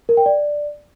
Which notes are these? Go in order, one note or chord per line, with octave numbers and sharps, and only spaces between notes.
A#4
G5
D5